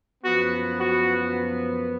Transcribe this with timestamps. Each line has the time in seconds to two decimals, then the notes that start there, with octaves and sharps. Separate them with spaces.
0.24 F#2 F3 B3 F#4
0.80 F#4